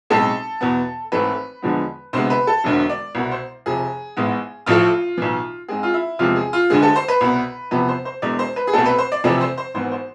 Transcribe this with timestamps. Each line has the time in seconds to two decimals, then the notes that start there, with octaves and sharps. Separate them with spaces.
0.10 B1 A2 G#3 C4 A4
0.61 E2 B2 B3
1.12 G#1 G#2 E3 A3 C4 B4
1.62 E2 D3 F3 G#3 B3
2.13 D2 C3 G#3 B3 C5
2.30 B4
2.47 A4
2.64 E1 D2 D3
2.89 D5
3.15 C2 B2 B3
3.31 C5
3.66 F1 F2 C3 G#4
4.17 A1 G#2 G#3 B3
4.66 A1 A2 F3 A3 F4
5.17 B1 A2 E3
5.68 G#2 G#3 C4 G#4
5.83 F4
5.94 E4
6.19 E2 C3 F3 G#3 C4 F4
6.36 G#4
6.53 F4
6.70 D2 D3 G#3 G#4
6.83 A4
6.96 C5
7.08 B4
7.21 C2 B2 B3
7.71 E2 C3 F3 B3 B4
7.88 C5
8.05 C5
8.22 E1 E2 B2 G#3 D5
8.39 C5
8.56 B4
8.67 G#4
8.73 C2 B2 A3 C4 A4
8.86 B4
8.98 C5
9.12 D5
9.24 F2 C3 E3 A3 C4 D5
9.41 C5
9.58 C5
9.74 G#1 G#2 E3 B3 C5
9.91 C5